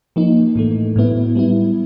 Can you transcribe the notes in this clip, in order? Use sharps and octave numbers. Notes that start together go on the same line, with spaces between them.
F3 A#3 D#4
A2 E3 A3
A2 F#3 B3 E4
G3 B3 E4